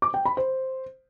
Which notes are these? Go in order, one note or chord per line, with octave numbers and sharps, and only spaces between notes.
D6
G5
B5
C5